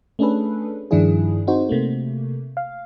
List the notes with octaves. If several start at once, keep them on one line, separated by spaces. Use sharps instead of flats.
A3 C#4 D4 G#4 A4 B4
G2 D#3 F3 D4 E4 G#4
C4 D#4 F#4 C5
C3 A3 A#3
F5